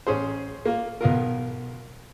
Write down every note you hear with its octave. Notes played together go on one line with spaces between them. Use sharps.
A1 C#4 G#4 C5
A#3 F4
B1 B3 F4 A#4